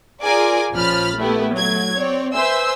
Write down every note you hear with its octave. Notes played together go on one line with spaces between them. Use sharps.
F4 G#4 A#4 D5 G#5 D6
A#1 F3 C#4 B5 F6 A6
A3 B3 E4 G4
F#3 A3 G#6
C4 C#5 D5
B4 C5 E5 G#5 C6 E6